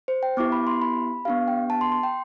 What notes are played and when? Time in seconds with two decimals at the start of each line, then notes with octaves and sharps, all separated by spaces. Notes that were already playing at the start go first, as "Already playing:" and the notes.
0.08 C5
0.23 G5
0.37 B3 E4 G4 D6
0.52 B5
0.67 C6
0.82 B5
1.25 B3 D4 G4 F5
1.48 G5
1.70 A5
1.81 C6
1.92 C6
2.03 G5